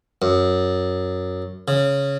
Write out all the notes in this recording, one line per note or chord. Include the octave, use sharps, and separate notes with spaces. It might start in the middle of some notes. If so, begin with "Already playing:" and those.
F#2
C#3